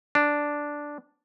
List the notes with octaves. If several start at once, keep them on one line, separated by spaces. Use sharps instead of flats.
D4